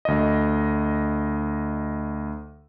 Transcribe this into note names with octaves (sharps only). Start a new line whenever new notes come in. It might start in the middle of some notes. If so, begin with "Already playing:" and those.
D2 D#5